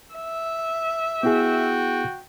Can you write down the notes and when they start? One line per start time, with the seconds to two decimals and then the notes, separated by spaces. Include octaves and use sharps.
0.15 E5
1.23 B3 E4 F#4 G#4 G5